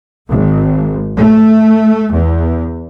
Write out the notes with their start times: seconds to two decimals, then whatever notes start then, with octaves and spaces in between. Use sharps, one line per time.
0.28 G#1
1.19 A3
2.11 E2